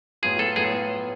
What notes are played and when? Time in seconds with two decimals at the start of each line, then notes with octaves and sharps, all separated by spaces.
0.23 A2 F#3 B3 F4 G#4
0.39 A4
0.56 A2 F#3 B3 F4 G#4